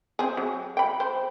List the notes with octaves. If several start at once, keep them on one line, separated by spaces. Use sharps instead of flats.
C4 G#4
F#3
G5 B5
C5